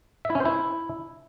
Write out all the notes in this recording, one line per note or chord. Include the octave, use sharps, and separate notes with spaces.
E5
E4
C#4
C5
E4